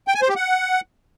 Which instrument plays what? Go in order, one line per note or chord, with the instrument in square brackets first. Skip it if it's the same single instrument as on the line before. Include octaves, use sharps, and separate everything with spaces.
[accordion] G5
G#5
C5
G4
F#5